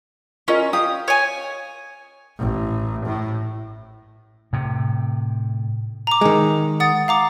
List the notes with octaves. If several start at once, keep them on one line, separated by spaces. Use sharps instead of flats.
C#4 F4 A#4 D#5
G4 F5 D#6
C#5 G#5
A1
A2
A2 C3
A#5 D6
D#3 G#3
F#5 D#6 A6
F5 A#5 D6